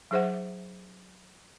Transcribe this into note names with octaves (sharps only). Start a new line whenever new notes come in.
F#3 D#4 G#4 C5 E5 F#5